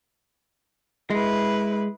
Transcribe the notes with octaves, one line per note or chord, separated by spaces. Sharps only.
G#3 E4 B4